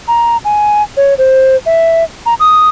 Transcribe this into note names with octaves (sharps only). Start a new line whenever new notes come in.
A#5
G#5
C#5
C5
E5
A#5
D#6